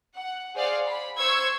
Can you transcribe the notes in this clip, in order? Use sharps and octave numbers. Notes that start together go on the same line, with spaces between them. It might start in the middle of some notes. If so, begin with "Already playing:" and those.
F#5
G#4 C5 D5 F5 F#5
B5
C5 C#6 E6 G#6